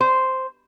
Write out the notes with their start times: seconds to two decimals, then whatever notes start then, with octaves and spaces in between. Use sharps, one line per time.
0.01 C5